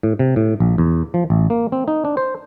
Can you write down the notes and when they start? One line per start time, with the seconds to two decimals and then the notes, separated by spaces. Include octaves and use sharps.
0.03 A2
0.19 C3
0.36 A2
0.60 A#1
0.78 E2
1.14 F3
1.30 A1
1.50 A#3
1.72 C4
1.88 D#4
2.05 D4
2.17 C5